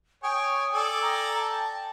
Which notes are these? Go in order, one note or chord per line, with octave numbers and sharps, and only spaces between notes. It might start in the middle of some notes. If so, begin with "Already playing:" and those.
C#5 G5 G#5 D#6
A4 D5 G#5
G5 A#5
A5